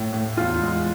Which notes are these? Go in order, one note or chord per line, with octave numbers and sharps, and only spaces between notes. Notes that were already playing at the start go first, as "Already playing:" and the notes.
Already playing: A2
A2
E2 F4
G#3